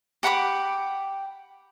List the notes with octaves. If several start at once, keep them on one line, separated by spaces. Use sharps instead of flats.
G4 F#5 B5 D6